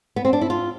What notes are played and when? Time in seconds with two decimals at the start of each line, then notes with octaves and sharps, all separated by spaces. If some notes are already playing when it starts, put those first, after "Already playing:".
0.16 B3
0.25 C4
0.33 D4
0.41 E4
0.50 F4